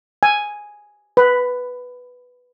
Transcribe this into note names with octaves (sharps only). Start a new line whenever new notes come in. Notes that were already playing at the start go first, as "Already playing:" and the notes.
G#5
B4